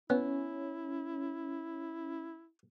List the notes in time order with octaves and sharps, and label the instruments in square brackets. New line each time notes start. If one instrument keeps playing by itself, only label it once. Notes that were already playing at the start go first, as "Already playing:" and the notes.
[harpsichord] B3 [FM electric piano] C#4 [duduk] E4